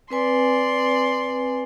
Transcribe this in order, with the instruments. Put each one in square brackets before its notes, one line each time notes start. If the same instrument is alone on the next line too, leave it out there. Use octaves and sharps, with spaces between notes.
[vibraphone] C4 B4 G#5 [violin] D5 C6